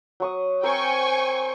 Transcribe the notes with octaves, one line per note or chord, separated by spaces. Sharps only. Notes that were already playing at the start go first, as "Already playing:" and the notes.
F#3 C#6 D#6
C4 A#4 C5 G5 G#5 C#6